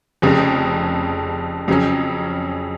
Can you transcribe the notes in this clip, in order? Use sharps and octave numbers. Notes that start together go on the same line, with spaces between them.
F1 F2 C#3
F2 C#3 F#3 C#4